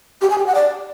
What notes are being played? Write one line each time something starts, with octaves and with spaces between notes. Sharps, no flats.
G4
G#5
G4
F#5
D5